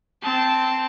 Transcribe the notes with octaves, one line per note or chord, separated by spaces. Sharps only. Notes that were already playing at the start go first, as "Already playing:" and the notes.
C4 A5